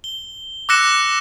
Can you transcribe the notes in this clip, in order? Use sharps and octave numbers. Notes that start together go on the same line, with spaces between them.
G7
D6 E6 F#6 A#6 C#7 E7